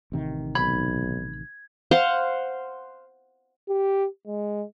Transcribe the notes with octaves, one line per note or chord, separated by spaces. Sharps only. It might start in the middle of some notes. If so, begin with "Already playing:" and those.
A1 C3 D#3
B1 B5 G#6
C5 F5 F#5
G4
G#3